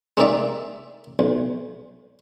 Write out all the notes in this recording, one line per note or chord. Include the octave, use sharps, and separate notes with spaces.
G#3 A#3 C4 D#4 D5 E5
B1